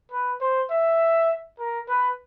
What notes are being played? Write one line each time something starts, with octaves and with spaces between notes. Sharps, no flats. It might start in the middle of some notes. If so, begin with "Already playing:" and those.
B4
C5
E5
A#4
B4